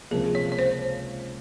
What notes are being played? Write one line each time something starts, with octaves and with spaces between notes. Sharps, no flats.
C#2 C3 F3 A#3 G#4
C#5
C#5
C5